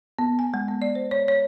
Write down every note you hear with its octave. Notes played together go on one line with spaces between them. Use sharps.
B3
G#5
G#3
B3
D5
C5
C#5
C#5